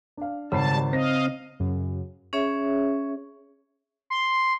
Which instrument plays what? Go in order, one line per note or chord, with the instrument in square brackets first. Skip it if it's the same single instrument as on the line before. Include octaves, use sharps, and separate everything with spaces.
[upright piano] D4 F5
[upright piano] G#1 B5 C7 [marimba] C#3 [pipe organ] G3 A5
[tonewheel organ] C4 [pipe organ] D#5 F5 [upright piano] A#6
[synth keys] F#2 C#3
[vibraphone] C#4 G#4 C#5 E5
[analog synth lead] C6